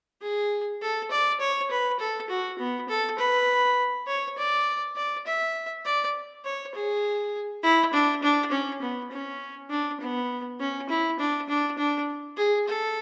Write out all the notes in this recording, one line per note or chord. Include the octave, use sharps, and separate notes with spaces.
G#4
A4
D5
C#5
B4
A4
F#4
B3
A4
B4
C#5
D5
D5
E5
D5
C#5
G#4
E4
D4
D4
C#4
B3
C#4
D4
B3
C#4
E4
D4
D4
D4
G#4
A4